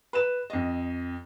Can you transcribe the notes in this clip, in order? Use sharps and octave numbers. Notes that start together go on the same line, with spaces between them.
B4 E7
F2 D#5